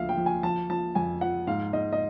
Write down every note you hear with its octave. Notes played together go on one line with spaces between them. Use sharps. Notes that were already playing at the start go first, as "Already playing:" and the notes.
Already playing: D2 D3 F3 E5 F5
G5
F3
G#5
F3 A5
F3 A5
F2 G#5
F3 F#5
G#2 F5
G#2 D#5
D#5